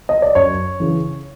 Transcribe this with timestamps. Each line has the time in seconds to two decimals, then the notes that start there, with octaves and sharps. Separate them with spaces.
0.09 D#5
0.22 D5
0.35 F#2 C#5
0.80 C#3 E3